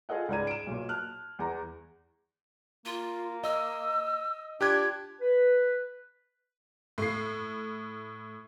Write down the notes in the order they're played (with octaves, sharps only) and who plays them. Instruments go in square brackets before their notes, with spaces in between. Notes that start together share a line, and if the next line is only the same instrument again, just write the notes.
[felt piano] F4 G#4 A4 D#5 F#5
C#2 G#2 D5 A#5 G#6 D#7
D7 E7
B1 A#2
A5 F6 F#6
E2 A#5
[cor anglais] A#3 [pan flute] F4
[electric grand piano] D#5 [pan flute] E6
[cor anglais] D4 [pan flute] F4 [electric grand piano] G4 F#6 G#6
[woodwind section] B4
[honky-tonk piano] A2 C7